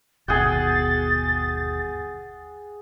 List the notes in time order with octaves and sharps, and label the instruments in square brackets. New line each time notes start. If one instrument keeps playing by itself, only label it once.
[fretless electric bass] G1 D#2 B2 [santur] G#4 F#5 G5 [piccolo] A6